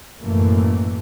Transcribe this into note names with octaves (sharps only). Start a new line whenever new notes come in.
A1 F#2 B2 E3 A3 A#3